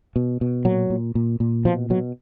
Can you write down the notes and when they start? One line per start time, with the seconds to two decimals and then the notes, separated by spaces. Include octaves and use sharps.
0.16 B2
0.41 B2
0.65 A#2 F#3
0.90 A#2
1.15 A#2
1.40 A#2
1.65 B2 F3
1.90 B2 F#3